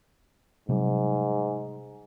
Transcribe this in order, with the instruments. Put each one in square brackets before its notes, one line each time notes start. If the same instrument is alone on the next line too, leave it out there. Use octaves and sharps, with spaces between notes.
[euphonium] G#2 [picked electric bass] C3 F#3 G3